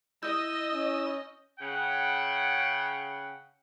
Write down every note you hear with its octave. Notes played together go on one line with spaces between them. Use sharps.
E4 D#5 D#6 E6 G6
C#4
C#3 F#5 G5